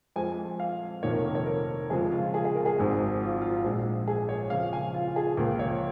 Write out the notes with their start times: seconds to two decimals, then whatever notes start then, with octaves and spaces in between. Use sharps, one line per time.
0.16 F2 F3 G#3 G#5
0.60 F5
1.03 F1 F2 D#3 A#3 C#5
1.14 A#4
1.25 A#4
1.35 C#5
1.46 A#4
1.90 F2 C#3 F3 G#3 G#4
2.11 F4
2.34 G#4
2.45 G#4
2.55 A#4
2.66 G#4
2.78 G#1 G#2 G#3
3.21 F4
3.42 F4
3.64 A#1 A#2 G#3
4.08 G#4
4.29 C#5
4.50 F2 C#3 F3 F5
4.73 G#5
4.94 F4
5.08 F4
5.16 G#4
5.37 C#2 C#3 F3 A#3 A#4
5.59 C#5